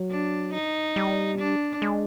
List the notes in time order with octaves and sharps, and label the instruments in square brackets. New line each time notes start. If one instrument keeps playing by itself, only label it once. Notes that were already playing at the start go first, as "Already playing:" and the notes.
Already playing: [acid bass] F#3
[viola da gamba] D4
D#4
[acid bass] G3
[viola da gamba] D4
[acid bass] G#3